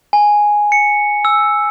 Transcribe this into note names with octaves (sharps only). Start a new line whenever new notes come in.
G#5
C#7
E6